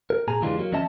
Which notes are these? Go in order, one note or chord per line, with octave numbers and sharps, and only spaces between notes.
A#4
A#2 G#4 G#5 A#5
F2 D3 E3 G3 G#3 F4
F#3 A#3
D#2 F3 C#4 D#5 E5 A5